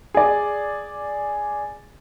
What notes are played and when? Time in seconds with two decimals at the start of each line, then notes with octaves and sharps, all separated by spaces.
0.14 G#4 D5